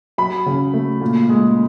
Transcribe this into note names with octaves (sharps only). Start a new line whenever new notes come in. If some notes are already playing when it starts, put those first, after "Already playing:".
F#3 B5
C#3
A3
A#2
G#3